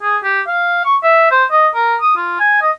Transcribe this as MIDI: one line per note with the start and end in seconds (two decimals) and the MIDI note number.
0.02 0.17 68
0.24 0.41 67
0.47 0.81 77
0.85 0.96 85
1.03 1.27 76
1.31 1.44 72
1.51 1.68 75
1.75 1.96 70
2.01 2.16 87
2.16 2.37 65
2.40 2.57 80
2.62 2.71 75